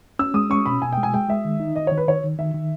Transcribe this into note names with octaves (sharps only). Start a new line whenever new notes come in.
C#4 E6
G#3 D#6
C#4 C#6
B2 B5
B2 G#5
G5
G#3
G#5
G#3 G5
G#3 E5
D#3
D#4
D#3 D#5
D#3 C#5
B4
D#3 C#5
D#3
D#3 E5
D#3